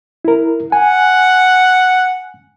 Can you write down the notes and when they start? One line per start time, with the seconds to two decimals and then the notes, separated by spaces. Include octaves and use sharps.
0.25 E4 A#4
0.72 F#5 G#5